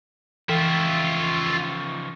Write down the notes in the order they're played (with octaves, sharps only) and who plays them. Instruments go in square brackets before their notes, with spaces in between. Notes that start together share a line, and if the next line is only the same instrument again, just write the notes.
[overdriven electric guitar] C#3 F3 [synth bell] E3 [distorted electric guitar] F4 E5